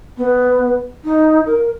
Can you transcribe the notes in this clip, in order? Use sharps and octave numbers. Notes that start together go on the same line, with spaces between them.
B3
D#4
A#4